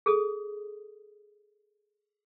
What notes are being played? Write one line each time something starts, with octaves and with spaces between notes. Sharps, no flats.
G#4 A4 D#6